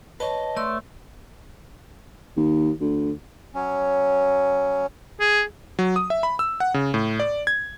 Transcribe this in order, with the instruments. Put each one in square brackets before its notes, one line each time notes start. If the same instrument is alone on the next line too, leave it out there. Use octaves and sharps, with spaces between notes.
[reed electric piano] B4 C#5 [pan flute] D#5 [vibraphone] A5
[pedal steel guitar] A3 [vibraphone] D5 C6
[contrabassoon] D#2
D2
[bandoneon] F#3 C#4
[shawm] G#4
[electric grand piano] F#3
D#6
E5
B5
E6
F#5
C#3
A2
D5
G#6